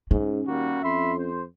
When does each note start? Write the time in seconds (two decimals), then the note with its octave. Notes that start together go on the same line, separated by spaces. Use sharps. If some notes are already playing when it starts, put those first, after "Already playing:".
0.11 G#2 C#4
0.47 D#2 G3 A#3 F#4
0.83 F2 E5 B5 C6
1.18 C5